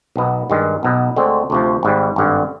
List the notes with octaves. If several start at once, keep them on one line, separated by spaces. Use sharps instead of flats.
B1 B2 B3
G2 D#3 G#3
B1 B2 B3
D2 D3 G#3 C4
D2 C3 F3
G#1 G#2 G3
G#1 G2 D3